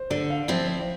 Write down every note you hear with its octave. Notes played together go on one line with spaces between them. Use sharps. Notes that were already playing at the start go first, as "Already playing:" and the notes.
Already playing: C5
D3 D5
F5
F3 C4 E4 D5
C5
D5